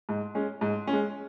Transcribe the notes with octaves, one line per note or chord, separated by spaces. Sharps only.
G#2
G#3 C#4
G#2
C#4
G#3